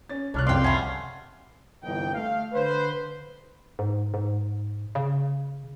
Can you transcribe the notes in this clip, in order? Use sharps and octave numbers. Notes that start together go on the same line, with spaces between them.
C#4 A6
C2 D4 C#5 F6 F#6
F#1 F2 C3 D5 F5 G5 C6
A3 C#4 F#5 B5
G1 C2 D3 E3 D#4 G5
A3 F5
D3 B4 C5
G#2
G#2
C#3